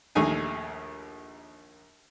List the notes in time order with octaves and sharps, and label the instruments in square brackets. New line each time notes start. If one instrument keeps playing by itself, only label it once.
[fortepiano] A#1 D#2 A3 D#4 G#5